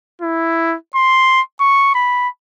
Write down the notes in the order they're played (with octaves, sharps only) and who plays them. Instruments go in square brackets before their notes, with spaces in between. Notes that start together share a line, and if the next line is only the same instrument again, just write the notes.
[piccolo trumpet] E4
C6
C#6
B5